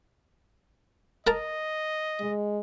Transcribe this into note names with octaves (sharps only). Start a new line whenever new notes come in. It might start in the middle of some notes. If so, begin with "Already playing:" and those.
A#4 D#5 A5 A#5
G#3